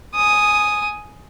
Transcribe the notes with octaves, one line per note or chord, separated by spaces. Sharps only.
G#5 D#6